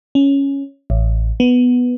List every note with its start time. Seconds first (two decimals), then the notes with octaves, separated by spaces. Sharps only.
0.15 C#4
0.90 A1
1.40 B3